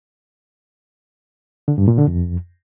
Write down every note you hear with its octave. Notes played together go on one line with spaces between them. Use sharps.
D3
G2
A#2
D3
F2